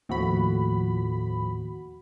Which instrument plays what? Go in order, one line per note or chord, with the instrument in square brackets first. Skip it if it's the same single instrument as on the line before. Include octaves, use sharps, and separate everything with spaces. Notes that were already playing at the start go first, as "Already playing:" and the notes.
[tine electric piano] D#2 F#4 [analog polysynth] A2 F3 B5